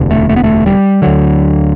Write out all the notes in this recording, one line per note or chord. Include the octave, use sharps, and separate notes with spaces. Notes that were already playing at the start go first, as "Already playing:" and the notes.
Already playing: E1 D2 C3
A3
A3
B3
A3
G3
D2 D3 F#3